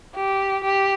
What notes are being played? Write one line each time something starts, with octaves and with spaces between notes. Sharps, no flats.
G4
G4